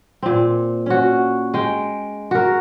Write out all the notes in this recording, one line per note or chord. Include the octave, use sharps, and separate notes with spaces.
A#2 C4
C#4 F#4
G#3 G5
F#4 A#4